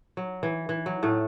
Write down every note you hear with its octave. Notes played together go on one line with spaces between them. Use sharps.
F#3
E3
E3
F#3
A2 A3